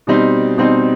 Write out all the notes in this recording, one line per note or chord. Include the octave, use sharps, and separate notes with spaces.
B2 G3 C4 D#4
B2 G3 C4 D#4